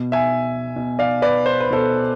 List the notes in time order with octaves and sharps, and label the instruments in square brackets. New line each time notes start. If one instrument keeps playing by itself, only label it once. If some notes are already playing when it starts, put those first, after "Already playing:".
Already playing: [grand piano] B2
E5 G#5
B2
D5 F5
B4 D5
C5
B4
B2 A4 C5